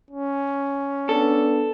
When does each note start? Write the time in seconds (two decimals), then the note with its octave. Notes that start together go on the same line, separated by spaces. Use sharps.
0.11 C#4
1.09 B3 D4 A4